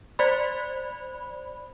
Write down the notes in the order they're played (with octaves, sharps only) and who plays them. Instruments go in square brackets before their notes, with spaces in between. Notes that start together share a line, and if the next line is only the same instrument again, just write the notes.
[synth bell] C5 D5 B5